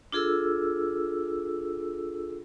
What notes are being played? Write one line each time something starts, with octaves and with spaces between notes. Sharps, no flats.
D4 F4 G#4 A4 E6